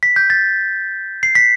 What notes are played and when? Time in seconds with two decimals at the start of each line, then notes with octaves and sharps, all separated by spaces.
0.03 B6
0.16 G6
0.30 A6
1.23 C7
1.35 B6